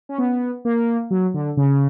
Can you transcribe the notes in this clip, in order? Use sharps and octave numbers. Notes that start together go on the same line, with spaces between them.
C#4
B3
A#3
F#3
D3
C#3